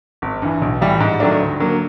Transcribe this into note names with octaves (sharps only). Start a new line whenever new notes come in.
G#1
G2 E3
B1
A2 E3 G3
G#2
D#3 F#3 A3 D4
D2
D3 F#3 A#3